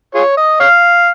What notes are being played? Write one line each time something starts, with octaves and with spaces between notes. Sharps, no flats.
F4 G#4 C#5
D#5
C#5 F5